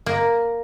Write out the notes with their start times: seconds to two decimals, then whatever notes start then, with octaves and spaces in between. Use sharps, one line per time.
0.06 A#3